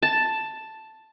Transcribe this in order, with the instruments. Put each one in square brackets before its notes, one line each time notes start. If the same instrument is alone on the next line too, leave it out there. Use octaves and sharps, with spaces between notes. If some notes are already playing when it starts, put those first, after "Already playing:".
[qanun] A5